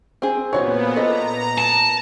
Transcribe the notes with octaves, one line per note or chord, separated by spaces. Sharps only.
C4 G#4
A#2 E3 B3 F#4 C5 C#5
A4 D#5 A#5
A5